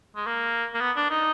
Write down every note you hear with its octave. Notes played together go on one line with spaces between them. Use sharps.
G#3
A#3
A#3
B3
D4
D#4